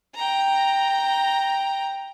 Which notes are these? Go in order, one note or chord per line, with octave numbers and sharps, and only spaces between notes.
G5 A#5